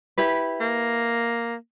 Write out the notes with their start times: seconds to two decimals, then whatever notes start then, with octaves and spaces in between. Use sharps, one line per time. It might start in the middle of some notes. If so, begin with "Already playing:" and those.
0.18 E4 G4 B4
0.60 A#3